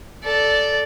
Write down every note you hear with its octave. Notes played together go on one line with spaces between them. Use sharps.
A4 D5